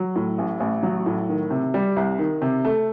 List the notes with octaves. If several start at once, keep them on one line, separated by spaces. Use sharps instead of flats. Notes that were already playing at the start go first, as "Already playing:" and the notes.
Already playing: F#3
A2
A1
A1
F#3
A2
D#3
C3
G3
C2
D#3
C3
A3